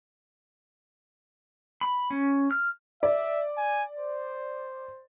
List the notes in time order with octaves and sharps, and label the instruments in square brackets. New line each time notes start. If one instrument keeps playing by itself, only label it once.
[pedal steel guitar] B5
C#4
F6
[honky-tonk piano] D5 [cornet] E5
[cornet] G#5
C5